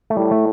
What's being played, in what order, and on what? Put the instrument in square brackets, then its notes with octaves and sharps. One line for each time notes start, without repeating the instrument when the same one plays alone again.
[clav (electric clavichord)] A3
[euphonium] A2 [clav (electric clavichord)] G3
[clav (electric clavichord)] A3